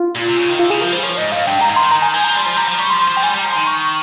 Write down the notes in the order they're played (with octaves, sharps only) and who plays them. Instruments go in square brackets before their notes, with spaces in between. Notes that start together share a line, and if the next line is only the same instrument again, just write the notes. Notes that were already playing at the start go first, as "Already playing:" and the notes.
Already playing: [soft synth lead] F4
[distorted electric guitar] A#2
C3
C#3
D#3
[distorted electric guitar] C3 [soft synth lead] F4
[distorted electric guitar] C#3 [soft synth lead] G#4
[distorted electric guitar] F3 [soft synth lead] A#4
[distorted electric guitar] G3 [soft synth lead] C5
[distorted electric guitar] F3 [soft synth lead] C#5
[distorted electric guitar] G#2 [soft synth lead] D#5
[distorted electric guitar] G2 [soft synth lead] F5
[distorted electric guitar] G2 [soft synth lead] G5
[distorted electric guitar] G#2
[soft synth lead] A#5
[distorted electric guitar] G#2
[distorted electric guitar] D#3 [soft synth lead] C6
[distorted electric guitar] D#3 [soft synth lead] A#5
[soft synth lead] G#5
[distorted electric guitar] F3 [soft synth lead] G#5
[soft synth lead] A#5
[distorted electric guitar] G3 [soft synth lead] C6
[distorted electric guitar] F3 [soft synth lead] C6
[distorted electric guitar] G3 [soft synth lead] A#5
[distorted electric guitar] F3
[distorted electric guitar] G3 [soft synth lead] C#6
[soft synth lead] C6
[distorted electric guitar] F3
[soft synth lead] C6
[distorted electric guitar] F3
[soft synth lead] G5
[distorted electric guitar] G3 [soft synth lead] G#5
[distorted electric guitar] G3 [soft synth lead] A#5
[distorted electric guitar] F3
[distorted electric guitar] D#3 [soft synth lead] C6
[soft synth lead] C#6
C#6